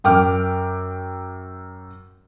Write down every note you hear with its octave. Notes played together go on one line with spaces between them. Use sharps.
F#2 G5 D6 F6